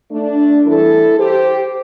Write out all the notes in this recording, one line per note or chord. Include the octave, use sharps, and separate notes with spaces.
A3 D4
E2 E3 G3 E4 A4
G4 C5